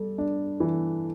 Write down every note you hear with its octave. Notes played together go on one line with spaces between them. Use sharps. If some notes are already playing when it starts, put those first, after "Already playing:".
Already playing: G3 A4
D4
E3